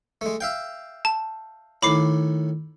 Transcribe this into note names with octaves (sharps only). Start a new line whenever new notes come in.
G#3 A3
E5 F5 G5
A5
A2 D#3 B5 D6 C7